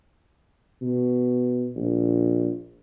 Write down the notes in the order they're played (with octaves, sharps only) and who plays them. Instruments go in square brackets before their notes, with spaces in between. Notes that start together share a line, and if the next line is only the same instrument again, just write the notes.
[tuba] B2
A#1